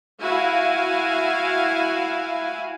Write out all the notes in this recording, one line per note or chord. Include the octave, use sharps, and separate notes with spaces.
E4 F#4 F5 G#5